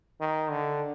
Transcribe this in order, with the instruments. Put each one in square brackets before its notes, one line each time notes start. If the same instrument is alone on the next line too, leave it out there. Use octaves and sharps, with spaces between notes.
[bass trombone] D#3
D3